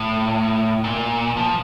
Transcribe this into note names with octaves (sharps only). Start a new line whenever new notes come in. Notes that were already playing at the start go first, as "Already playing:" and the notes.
Already playing: A2
A#2
F3